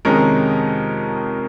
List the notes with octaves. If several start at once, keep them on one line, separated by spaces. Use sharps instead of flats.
F2 C3 D#3 G#3 C#4 A#4